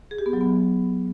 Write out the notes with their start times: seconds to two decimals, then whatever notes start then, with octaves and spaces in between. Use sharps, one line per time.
0.11 G#4
0.18 G4
0.26 B3
0.33 F#3
0.41 B3